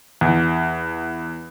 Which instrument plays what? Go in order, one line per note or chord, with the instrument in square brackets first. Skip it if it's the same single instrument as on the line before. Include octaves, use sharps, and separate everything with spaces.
[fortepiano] E2